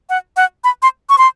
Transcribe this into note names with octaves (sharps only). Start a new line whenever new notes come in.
F#5
F#5
B5
C6
C#6
C6